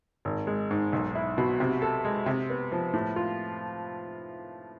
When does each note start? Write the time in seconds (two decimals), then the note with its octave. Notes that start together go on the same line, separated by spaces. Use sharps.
0.25 G#1
0.47 G#3
0.71 G#2
0.92 B1
1.15 E4
1.38 B2
1.60 C3
1.82 A4
2.05 G#3
2.26 C3
2.50 B3
2.72 F3
2.93 A2
3.16 F4